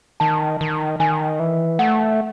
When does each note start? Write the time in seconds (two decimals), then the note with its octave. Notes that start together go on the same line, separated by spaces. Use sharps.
0.20 D#3 A5
0.61 D#3
1.00 D#3 G#5
1.40 E3
1.79 A3 F#5